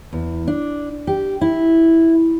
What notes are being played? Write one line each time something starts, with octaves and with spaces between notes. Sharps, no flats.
E2
D4
G4
E4